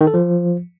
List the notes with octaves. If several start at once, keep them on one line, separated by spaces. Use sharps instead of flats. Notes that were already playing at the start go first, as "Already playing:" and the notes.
D#3
A4
F3